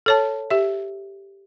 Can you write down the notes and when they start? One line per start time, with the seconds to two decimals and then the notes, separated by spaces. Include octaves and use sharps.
0.06 A4 C#5 A5
0.50 G4 E5